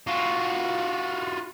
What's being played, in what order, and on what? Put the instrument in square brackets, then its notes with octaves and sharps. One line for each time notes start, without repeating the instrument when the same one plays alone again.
[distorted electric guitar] F4 F#4